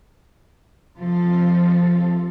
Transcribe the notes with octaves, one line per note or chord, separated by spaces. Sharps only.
C3 F3 F4 A4